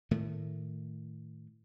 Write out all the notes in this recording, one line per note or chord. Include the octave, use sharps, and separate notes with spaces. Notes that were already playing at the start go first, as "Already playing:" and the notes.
A2 D#3 A3